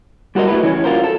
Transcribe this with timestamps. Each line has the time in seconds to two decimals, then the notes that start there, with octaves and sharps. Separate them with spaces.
0.35 G3 F#4 A#4 C5 D#5
0.48 A3 E4 G4 B4
0.63 E3 C#4
0.84 F4 F#4 A#4 C5
1.04 A4